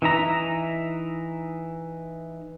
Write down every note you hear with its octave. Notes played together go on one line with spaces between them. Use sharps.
E3 D#4 E5 A#5